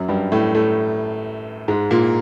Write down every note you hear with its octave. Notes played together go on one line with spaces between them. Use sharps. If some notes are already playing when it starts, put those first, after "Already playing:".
Already playing: F#2 F#3
G2 G3
A2 A3
A2 A3
G#2 G#3
A#2 A#3